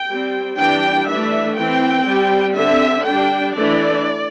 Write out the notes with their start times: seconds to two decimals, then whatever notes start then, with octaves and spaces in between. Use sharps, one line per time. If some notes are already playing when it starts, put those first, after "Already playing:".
Already playing: G5
0.09 G3 C4
0.58 E3 G3 D4 G5
1.07 E3 A3 D4 E5
1.57 E3 C4 G5
2.06 G3
2.11 C4
2.55 D3 C4 E5
3.05 G3 D4 G5
3.54 E3 A3 D4 D5